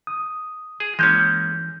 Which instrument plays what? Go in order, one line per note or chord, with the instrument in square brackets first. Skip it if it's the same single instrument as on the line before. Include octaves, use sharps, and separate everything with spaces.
[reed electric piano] D#6
[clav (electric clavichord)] G#4
[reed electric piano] E3 G6 [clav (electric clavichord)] G#3 A#3 C#4